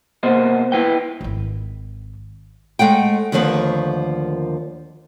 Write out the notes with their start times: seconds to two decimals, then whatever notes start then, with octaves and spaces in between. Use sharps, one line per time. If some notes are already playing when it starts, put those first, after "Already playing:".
0.23 B2 A#3 C5 D#5
0.72 E4 B4 G5
1.21 D#1 G#1
2.79 G#3 A3 F#5 G5
3.32 D#2 D3 D#3 F3 A3 B3